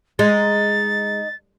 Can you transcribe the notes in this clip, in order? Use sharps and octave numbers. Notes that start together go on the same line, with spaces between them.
G#3 D#4 A6